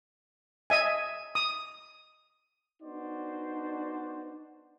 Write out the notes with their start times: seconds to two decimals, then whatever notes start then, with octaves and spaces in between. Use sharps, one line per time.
0.70 D#5 E5 G#5
1.35 D#6
2.82 B3 D4 D#4 F#4 C5 D5